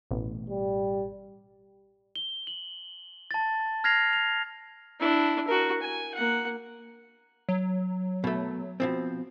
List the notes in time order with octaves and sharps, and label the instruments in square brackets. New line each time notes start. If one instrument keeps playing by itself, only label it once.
[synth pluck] A1 B2
[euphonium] G3
[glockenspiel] G7
F#7
A5 A6
F6 G#6 A#6 C7 F7
F7
[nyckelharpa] D4 E4
F#4 A#4
G#5
A#3 F#5
[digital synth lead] F#3
[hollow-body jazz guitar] B2 A3
B2 F3 C4